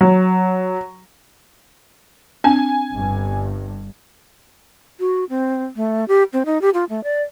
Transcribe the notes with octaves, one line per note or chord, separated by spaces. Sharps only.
F#3
C4 D4 G#5
G1 G2
F#4
C4
A3
G4
C4
D#4
G4
F4
A3
D5